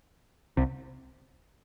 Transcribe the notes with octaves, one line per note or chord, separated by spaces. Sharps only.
C2 C3